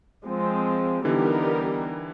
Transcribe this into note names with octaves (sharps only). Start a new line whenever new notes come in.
F3 G#3 C4
D3 E3 G3 B3 D#4 G4 A#4